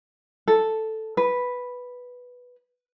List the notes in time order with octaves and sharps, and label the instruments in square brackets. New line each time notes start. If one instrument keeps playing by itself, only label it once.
[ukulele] A4
B4